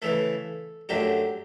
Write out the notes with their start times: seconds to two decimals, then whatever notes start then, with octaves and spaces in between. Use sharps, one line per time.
0.02 C#3 E3 A3 A4
0.89 F#2 D3 F#3 A3 G4